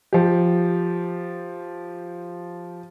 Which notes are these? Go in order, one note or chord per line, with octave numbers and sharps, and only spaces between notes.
F3 G4